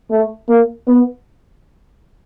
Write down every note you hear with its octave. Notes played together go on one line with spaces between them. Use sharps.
A3
A#3
B3